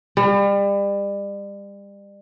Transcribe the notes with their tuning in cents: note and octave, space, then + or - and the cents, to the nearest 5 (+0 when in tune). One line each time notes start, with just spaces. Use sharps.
G3 +35